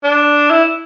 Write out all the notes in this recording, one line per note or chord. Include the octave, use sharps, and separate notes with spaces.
D4
E4